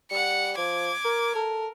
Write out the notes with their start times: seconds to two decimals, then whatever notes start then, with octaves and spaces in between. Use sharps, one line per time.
0.11 G3 F#5 C#7
0.57 F3 D6 G#6
1.04 A#4
1.35 A4 A#4